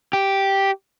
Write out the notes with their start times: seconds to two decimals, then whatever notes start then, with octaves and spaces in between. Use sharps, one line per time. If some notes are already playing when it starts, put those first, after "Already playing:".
0.13 G4